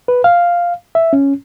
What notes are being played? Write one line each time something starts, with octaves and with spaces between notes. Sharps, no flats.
B4
F5
E5
C#4